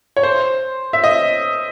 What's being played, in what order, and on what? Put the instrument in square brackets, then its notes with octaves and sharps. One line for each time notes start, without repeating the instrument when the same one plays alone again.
[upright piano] C#5
C5
E5
D#5